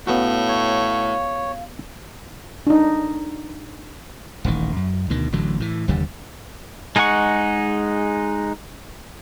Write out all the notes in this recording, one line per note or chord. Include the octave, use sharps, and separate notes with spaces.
A2 B3 C#4 F#4 F5
C#5
D4 D#4
D#1 A1 D#3
F#2
D2 B2 D#3
A1 A2 D3 F#3
A2 E3
F1 D#2 D3 G3
G#3 D#4 G#4 F#5 C#6